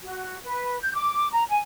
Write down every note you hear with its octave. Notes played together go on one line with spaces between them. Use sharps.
F#4
B4
G6
D6
A#5
G#5